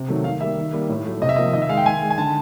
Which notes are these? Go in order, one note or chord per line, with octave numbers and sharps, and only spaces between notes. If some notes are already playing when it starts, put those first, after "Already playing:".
Already playing: C3
D#3 F#3 A3
D#3 F5
G3 A#3 E5
D#3
G3 A#3
A2
F#3 A3
C3 D#5
E5
F3 A#3 D#5
D#3 D#5
E5
G#3 F5
G5
D#3 G#5
G#3
G#5
D3 A5